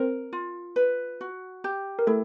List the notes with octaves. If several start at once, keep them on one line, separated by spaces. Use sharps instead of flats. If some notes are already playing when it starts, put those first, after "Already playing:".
Already playing: C4 A#4 C5
F4
B4
F#4
G4
A#4
A3 E4 A4